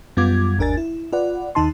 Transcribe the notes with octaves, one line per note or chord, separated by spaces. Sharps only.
F#2 G3 B3 F4 D6 G#6
G1 D#2 D4 A#4 G#5 A6
E4
F4 B4 D5 F#5
D#2 D#3 D#4 A5 C6